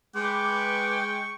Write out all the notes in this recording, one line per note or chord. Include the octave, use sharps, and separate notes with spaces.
G#3 B4 G5 C#6 D6